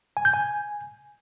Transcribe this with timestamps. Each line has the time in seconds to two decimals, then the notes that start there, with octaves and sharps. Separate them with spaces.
0.17 G#5
0.25 G6
0.33 G#5